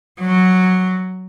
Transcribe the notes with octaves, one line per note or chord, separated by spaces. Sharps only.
F#3